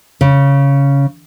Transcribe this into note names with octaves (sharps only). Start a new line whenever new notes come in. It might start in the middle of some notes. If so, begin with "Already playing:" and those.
C#3